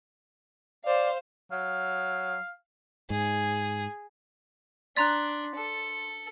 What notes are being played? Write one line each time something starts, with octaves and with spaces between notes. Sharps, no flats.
C5 D5 F5
F#3 F5
G#2 G#4
D4 D5 A#5 C6 F#6 A6 B6
A4